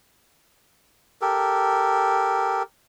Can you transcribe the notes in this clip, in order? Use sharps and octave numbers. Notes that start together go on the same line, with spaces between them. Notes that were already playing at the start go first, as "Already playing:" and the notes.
G4 A4 A#4